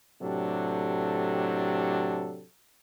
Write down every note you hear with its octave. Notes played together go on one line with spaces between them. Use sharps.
A2 C3 F#3 D4 G4 A4